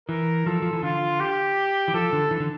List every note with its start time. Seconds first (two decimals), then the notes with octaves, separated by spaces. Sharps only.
0.09 E3 A#4
0.46 F3 A4
0.62 F3
0.73 E3
0.83 D3 F4
1.20 G4
1.88 E3
1.94 F3 A4
2.13 D3
2.31 E3
2.40 D3